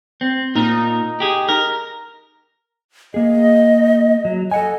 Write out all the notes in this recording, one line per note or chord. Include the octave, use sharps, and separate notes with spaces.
C4
A#2 D#4 A#4
G4 G#4
A#4
A#3 G#4 D#5
F#3
A4 D#5 F#5 G#5